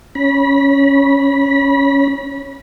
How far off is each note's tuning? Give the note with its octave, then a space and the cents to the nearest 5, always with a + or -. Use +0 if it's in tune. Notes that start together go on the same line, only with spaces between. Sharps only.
C#4 +0 B5 -30